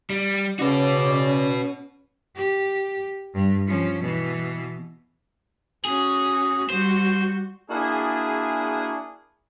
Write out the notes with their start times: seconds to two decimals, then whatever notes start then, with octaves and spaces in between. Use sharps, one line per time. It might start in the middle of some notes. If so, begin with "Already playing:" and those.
0.10 G3
0.59 C#3 C#4 F#4 B4 D5
2.36 G4
3.34 G2
3.67 F3 C#4
4.01 B2 E3
5.85 C#4 F#4 G#4
6.70 G3 F#4 C5
7.70 A#3 D4 E4 F#4 G#4